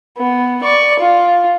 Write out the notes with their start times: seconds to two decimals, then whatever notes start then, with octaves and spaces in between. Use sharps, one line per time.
0.18 B3
0.63 D5 C#6
1.00 F4